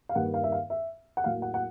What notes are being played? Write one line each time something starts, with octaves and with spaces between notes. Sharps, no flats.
F5
G2 D#3 G3 A#3 F#5
F5
E5
F5
E5
F#5
A2 F#3 A#3 F5
F#5
F#5